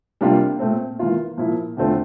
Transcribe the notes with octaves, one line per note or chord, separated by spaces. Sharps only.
C3 G3 A#3 D4 F4
A#2 A3 C4
E3 A#3 F4
A#2 F3 A#3 E4
E2 D3 A3 C4 F4